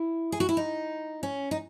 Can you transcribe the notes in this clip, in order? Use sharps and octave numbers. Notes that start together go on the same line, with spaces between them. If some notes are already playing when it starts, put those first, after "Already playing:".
Already playing: E4
G#4
F#4
E4
D#4
C#4
D#4